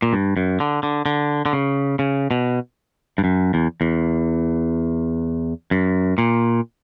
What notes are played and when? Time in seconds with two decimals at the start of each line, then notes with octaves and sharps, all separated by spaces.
0.02 A#2
0.13 G2
0.37 F#2
0.60 D3
0.83 D3
1.06 D3
1.46 D3
1.53 C#3
1.99 C#3
2.31 B2
3.18 G2
3.24 F#2
3.54 E2
3.81 E2
5.71 F#2
6.18 A#2